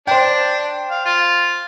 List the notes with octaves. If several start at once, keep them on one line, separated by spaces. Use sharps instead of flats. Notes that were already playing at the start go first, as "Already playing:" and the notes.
D4 C5 G5
F5
F4